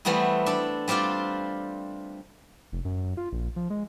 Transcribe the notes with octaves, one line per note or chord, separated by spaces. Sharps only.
E3 G3 A3 B3 C4 E4
D4 A4
G3 C4 D4 F4 D5
F1
F#2
F4
A#1
F3
G#3